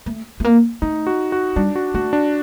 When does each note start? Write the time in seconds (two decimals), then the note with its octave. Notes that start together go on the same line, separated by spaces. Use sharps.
0.06 A3
0.40 A3
0.44 A#3
0.82 A3 D#4
1.07 F#4
1.32 F#4
1.56 G3 D4
1.76 F#4
1.94 A3 F#4
2.13 D4